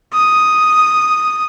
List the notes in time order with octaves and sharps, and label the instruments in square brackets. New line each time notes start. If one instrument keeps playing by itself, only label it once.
[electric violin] D#6